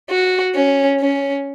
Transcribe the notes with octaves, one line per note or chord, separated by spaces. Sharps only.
F#4
C#4
C#4